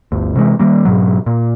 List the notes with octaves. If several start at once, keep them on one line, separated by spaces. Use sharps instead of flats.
G1 D2
C3 E3 G#3
D#3 G3 A#3
G#2 B2 F#3
A#2